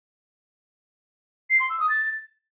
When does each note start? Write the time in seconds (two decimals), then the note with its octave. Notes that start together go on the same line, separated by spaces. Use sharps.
1.50 C7
1.60 C6
1.70 E6
1.80 D#6
1.89 A6